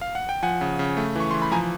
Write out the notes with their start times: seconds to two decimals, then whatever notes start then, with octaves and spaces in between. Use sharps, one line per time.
0.01 F5
0.15 F#5
0.29 G5
0.43 F3 F#5 G#5
0.61 C#3
0.79 C#3
0.97 A3
1.16 E3 C#6
1.31 E3 C6
1.42 B5
1.52 F3 G#5 A#5